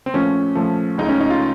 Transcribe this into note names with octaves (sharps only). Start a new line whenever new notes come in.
C4
A#2 F3 A3 C#4
A#2 F3 A3
C#2 C#3 A3 D#4
C#4
D#4
F4